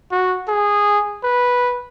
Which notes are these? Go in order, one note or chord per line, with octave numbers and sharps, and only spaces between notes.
F#4
G#4
B4